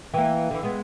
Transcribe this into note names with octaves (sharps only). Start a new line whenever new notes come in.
E3 A#3 G5
D3 E3
G#3 B3